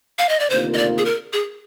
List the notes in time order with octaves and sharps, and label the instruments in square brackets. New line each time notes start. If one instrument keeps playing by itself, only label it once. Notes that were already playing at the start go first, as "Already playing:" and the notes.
[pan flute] F5
D#5
D5
[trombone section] D2 C3 D#3 A#3 F4 [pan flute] C5
[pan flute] D#5
D5
G#4
A#4
G#4